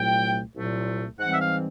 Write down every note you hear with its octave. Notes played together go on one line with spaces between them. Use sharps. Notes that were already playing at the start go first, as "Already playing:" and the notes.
Already playing: C2 A#2 F#3 A3 G5
C2 A#2 F#3 A3
G#2 E3 G3 C4 F#5
E5
F5